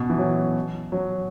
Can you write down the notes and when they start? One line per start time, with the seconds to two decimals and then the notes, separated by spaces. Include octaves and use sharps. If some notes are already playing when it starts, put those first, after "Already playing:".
Already playing: B2
0.10 E3
0.18 F#3
0.92 F#3